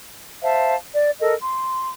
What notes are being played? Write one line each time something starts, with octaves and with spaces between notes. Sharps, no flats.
C5 E5 F5 A5
D5
A4 A#4 D#5
C6